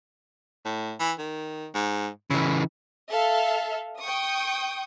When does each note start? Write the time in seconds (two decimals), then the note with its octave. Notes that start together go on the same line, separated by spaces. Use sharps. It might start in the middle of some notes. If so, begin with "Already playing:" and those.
0.65 A2
1.00 E3
1.19 D#3
1.75 G#2
2.31 C#3 E3 E4
3.09 A4 E5 F5
3.99 G5 C#6 D#6